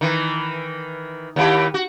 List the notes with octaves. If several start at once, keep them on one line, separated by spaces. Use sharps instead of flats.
D#3 E3
D#2 E4 G4
F#4